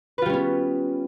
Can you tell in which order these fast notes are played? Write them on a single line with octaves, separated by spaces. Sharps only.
B4 F4 G3 C#4 B3